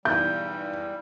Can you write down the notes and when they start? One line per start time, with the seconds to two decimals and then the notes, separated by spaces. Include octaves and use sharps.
0.05 B1 E2 G#2 G3 G6